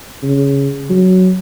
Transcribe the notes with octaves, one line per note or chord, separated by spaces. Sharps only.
C#3
F#3